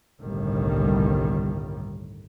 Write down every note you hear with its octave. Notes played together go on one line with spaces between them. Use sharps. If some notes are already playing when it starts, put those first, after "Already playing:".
G1 C2 A2 D#3 G3